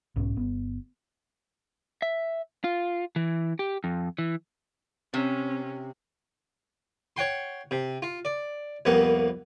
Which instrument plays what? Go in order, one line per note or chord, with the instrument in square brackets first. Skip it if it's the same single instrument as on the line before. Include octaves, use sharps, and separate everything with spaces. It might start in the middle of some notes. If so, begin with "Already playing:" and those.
[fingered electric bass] B1 G#2 C#4
G1 B3
[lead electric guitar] E5
F4
E3
G4
F2
E3
[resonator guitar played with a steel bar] C3 [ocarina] C4 [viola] C#4
[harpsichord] C#5 F#5 G5 C6
C3
F4
D5
C2 F2 A#3 B3 F#5